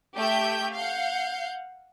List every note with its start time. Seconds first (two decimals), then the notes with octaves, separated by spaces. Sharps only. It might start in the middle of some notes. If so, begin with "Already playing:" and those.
0.17 A3 G4 E5 G5 G6
0.74 F5 F#5 G6